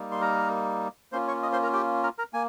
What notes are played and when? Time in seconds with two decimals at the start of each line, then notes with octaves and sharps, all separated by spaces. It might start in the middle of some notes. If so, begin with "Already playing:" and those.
Already playing: G3 A#3 D#4
0.12 C6
0.21 A#4 A#5
1.12 A#3 C#4 F4 C5 C6
1.28 C#5 C#6
1.43 D#5 D#6
1.52 C5 C6
1.63 A#4 A#5
1.73 G4 G5
2.03 A#4 A#5
2.18 A#4 A#5
2.33 A#3 G#5